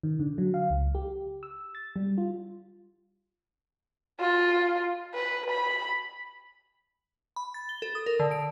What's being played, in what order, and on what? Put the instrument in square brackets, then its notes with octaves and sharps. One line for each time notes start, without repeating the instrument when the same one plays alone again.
[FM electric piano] D#3
D3
F#3
F5
C#2
G4
E6
A6
G3
F4
[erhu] F4
B4
B5
[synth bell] B5
A6
G7
A4
D#6
A#4
D3
D7